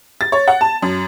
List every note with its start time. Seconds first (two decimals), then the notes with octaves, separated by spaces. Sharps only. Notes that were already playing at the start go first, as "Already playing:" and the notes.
0.21 A6
0.32 C#5
0.48 F#5
0.61 A5
0.82 F#2